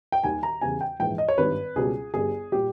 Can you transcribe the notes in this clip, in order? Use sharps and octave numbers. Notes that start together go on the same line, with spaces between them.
G5
D#2 D#3 G3 G#5
A#5
E2 C#3 G3 G#5
G5
A#1 G#2 E3 G#3 G5
D#5
C#5
G#1 G2 D#3 G3 B4
C#2 B2 G3 G#4
G1 G2 G3 G#4
A#2 G3 G4